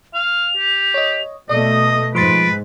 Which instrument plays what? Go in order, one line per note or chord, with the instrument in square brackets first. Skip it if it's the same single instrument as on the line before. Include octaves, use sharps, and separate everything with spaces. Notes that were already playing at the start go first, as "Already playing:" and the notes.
[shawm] F5 [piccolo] F7
[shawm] G4
[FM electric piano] C#5 D#5
[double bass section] B2 A3 [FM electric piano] D5 [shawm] D#5 [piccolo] D#6
[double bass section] G#2 [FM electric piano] F3 C6 A6 [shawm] B4 [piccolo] D7